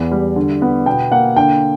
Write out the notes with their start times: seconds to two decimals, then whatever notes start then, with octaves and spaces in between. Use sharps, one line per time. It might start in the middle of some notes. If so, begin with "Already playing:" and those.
Already playing: E2 B3
0.11 G3
0.36 D3
0.62 B3
0.86 B2 G5
1.12 A#3 F#5
1.36 D3 G5